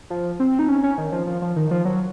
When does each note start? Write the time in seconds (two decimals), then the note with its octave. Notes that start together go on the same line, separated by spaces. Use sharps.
0.10 F3
0.40 C4
0.59 D#4
0.69 C#4
0.83 C#4
0.98 D#3
1.12 F3
1.27 F3
1.42 F3
1.56 D#3
1.71 F3
1.85 F#3